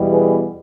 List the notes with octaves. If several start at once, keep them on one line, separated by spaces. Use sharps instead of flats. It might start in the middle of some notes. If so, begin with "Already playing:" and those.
Already playing: E2 B2 G3
G#4 B4